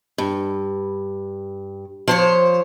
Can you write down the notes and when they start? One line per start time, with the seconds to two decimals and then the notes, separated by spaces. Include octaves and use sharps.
0.18 G2
2.08 F3 C5 C#5